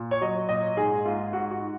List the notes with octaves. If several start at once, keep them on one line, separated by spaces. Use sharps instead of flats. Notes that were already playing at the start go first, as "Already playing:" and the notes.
Already playing: A#2
C#5
F#3 D#5
A#2 D#5
G#2 G#4
G#2 F4
G#2 F#4
F#4